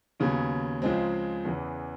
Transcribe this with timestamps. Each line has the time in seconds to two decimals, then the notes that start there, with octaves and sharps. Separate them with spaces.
0.20 D#2 C#3 F#3 B3
0.82 C#2 C#3 F3 G#3 C4
1.45 E2 C#3 E3